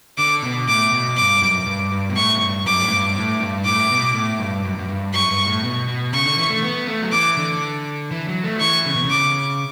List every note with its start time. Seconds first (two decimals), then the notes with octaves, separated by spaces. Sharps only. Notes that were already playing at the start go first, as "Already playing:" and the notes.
0.18 D3 D6
0.43 B2
0.68 A2 D6
0.93 B2
1.17 G2 D6
1.42 F#2
1.66 G2
1.92 G2
2.10 B2
2.16 A2 C#6
2.36 F#2
2.41 G2
2.66 F#2 D6
2.82 A2
2.91 G2
3.15 A2
3.40 G2
3.65 A2 D6
3.90 B2
4.14 A2
4.39 G2
4.65 F#2
4.79 F#2
4.88 G2
5.13 F#2 C#6
5.31 G2
5.47 A2
5.63 B2
5.88 B2
6.13 C#3 C#6
6.26 D3
6.38 E3
6.50 A3
6.62 B3
6.87 A3
7.02 F#3
7.12 E3 D6
7.37 D3
8.11 E3
8.28 F#3
8.44 A3
8.56 F#3
8.60 E3 C#6
8.86 C#3
8.96 B2
9.05 C#3
9.10 D6